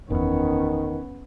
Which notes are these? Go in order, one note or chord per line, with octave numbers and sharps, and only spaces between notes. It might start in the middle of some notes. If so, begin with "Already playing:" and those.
F#1 E2 D#3 B3 C#4